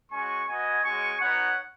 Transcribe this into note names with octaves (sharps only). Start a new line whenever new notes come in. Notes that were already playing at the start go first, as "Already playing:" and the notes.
G#3 C#4 F#4 G#5 C#6
B3 F#4 D#5 G#5
G#3 C#4 F#4 G#5 C#6
B3 D#4 F#4 C#5 F#5